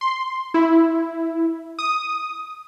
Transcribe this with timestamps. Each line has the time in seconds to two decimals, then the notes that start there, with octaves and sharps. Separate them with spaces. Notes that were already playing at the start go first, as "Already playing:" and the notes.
0.01 C6
0.54 E4
1.79 D#6